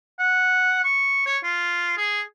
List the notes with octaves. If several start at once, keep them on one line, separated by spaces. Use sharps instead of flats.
F#5
C#6
C#5
F4
G#4